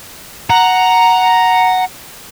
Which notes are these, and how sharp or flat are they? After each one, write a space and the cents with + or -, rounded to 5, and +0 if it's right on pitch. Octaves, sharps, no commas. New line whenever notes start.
F#5 +0 A#5 +0